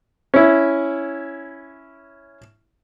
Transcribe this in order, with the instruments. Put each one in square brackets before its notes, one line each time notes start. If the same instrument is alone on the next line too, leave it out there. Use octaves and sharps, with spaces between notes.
[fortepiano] C#4 E4